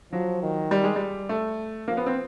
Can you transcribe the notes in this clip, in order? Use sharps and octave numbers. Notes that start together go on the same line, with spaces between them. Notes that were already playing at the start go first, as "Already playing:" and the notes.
F3 F#3
D#3
G3
G#3
G3
A3
F3 A#3
B3
C4